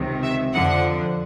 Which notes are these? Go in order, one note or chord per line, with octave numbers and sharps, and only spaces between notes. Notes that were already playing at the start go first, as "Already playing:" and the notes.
Already playing: C#2 C3 D#3
E5
F2 D3 F3 F#5